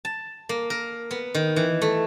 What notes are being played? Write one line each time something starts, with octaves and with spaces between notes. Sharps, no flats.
A5
A#3
A#4
B3
D#3
E3
A3